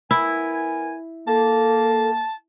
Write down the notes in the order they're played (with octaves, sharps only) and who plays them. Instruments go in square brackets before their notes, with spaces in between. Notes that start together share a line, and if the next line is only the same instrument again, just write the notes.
[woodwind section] B3 A#4 G#5 [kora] E4
[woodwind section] A#3 [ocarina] A4 [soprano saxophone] A5